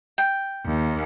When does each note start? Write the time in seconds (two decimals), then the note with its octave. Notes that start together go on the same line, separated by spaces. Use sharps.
0.18 G5
0.66 D#2